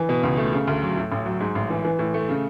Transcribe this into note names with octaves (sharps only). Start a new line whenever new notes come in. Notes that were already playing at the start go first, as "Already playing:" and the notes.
Already playing: E3
B2
C#2
A3
C#3
D2
F#3
A2
A1
F#3
G#2
A1
E3
E3
A2
A3
C#3